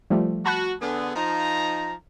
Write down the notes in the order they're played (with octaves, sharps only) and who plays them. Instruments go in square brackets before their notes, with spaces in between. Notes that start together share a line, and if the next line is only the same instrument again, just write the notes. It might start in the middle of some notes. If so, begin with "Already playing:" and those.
[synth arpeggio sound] F3 G3 A3
[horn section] F#4 [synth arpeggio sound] A5 B5 F#6
[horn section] D3 B3 G#4
F3 D#4 A#5